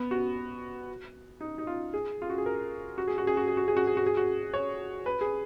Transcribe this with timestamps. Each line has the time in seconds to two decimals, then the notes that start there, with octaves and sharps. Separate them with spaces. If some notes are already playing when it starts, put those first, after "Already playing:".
Already playing: B3
0.11 F#4
1.41 D#4
1.58 D#4
1.67 F4
1.94 G#4
2.22 F4
2.30 F#4
2.38 G#4
2.46 A#4
2.98 F#4
3.07 G#4
3.18 F#4
3.27 G#4
3.37 F#4
3.48 G#4
3.57 F#4
3.68 G#4
3.77 F#4
3.87 G#4
3.97 F#4
4.06 G#4
4.17 F#4
4.54 C#5
5.06 B4
5.21 G#4